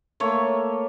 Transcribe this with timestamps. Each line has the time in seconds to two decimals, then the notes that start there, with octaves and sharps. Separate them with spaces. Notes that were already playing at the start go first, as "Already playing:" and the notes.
0.20 A3 A#3 C#5